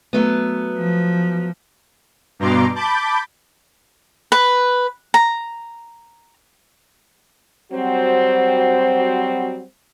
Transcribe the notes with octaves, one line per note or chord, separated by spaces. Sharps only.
F#3 A3 B3
F3
G2 B2 A#5 C6 D6
A5 B5 D6 G6
B4
A#5
F#3 G3 C4 F#4 C5